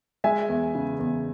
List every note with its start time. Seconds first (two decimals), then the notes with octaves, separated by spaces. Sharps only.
0.24 G#3 E5 G#5
0.48 E2
0.75 C#3
0.99 E2